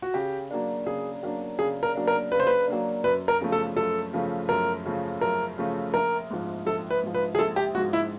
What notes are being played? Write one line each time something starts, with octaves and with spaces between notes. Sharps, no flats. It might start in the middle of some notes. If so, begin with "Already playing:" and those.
F#4
C#3 G4
F#3 A#3 D4
C#3 G#4
F#3 A#3 D4
C#3 G#4
A#4
F#3 A#3 D4
A#4
C#3 B4
C5
B4
F#3 A#3 D4
F#2 B4
A#4
C#3 F3 A3
A4
F#2 A4
C#3 F3 A3
F#2 A#4
C#3 F3 A3
F#2 A#4
C#3 F3 A3
A#1 A#4
G#2 F3
A#1 A4
B4
G#2 F3
B4
G#4
A#1 A4
G4
G#2 F3 F#4
E4